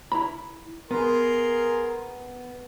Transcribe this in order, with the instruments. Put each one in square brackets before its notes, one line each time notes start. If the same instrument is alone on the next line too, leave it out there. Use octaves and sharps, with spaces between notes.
[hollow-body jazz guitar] E4 A#5 B5
[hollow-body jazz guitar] B3 [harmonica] G#4 A#4 C6